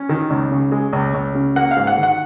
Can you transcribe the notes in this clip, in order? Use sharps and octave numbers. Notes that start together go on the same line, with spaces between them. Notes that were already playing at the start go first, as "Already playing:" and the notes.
Already playing: C#4
D#3
C#2
C#3
G#3
C#2
C#2
C#3
A#3 F#5
F5
G#2
F#5
D#3
F#5